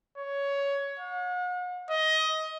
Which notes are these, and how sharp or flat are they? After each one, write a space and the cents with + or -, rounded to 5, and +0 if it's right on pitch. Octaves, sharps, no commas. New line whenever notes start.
C#5 +15
F#5 -45
D#5 +20